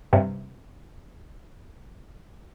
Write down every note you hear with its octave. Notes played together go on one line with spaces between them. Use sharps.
G2 C3